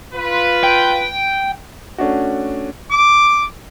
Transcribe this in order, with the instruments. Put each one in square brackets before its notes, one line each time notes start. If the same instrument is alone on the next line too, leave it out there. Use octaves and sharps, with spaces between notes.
[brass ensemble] F4 B4
[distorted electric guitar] G5
[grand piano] A3 C#4 D4 F#4
[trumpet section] D6